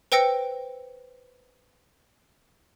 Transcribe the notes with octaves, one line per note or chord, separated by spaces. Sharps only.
B4 C5 G5 E6 A#6 C#7